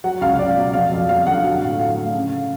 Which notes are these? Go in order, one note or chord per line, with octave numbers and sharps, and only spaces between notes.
F#3 F#5
C#2 F5
C#2 D5
B2
F2 F5
F2
F2 F5
D3 F#5
F#3 F5
A2
F#3 F5
A3
C#3